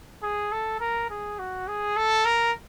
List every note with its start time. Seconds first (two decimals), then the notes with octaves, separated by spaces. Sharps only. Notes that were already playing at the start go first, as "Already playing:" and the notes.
0.23 G#4
0.52 A4
0.80 A#4
1.10 G#4
1.39 F#4
1.68 G#4
1.96 A4
2.26 A#4